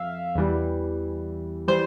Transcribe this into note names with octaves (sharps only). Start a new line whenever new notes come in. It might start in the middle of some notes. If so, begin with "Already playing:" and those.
Already playing: F2 E5 F5
E2 E3 G3
E3 G3 C5